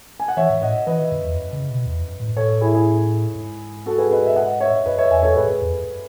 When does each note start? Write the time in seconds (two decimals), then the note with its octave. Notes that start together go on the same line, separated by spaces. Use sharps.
0.20 G#5
0.28 F#5
0.37 E3 C#5 E5
0.50 G#2
0.62 A2 D#5 F#5
0.87 E3 B4 D#5
0.99 D#3
1.12 F#2
1.24 E2
1.36 F#2
1.53 C#3
1.70 B2
1.86 E2
2.03 F#2
2.20 A2
2.36 A2 A4 C#5
2.61 E4 G#4
2.74 E4 G#4
3.36 G#2
3.86 F#4 A4
3.98 G#4 B4
4.11 B4 D#5
4.27 E5
4.36 D#5 F#5
4.60 C#5 E5
4.86 F#2 B4 D#5
4.98 C#5 E5
5.11 E2 E5 G#5
5.23 A4 C#5
5.36 G#2 G#4 B4
5.48 G#2
5.61 E2
5.73 F#2